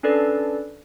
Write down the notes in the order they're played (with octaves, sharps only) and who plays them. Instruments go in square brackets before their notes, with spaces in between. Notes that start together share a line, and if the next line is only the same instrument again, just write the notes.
[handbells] C#4 D4 A4 B4 D5